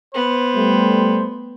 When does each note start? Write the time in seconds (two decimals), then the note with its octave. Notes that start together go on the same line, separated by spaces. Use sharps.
0.14 B3 C5
0.55 G3 A3